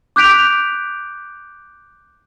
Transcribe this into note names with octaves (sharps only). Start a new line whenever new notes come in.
D6 F#6 G6 B6 D7 F7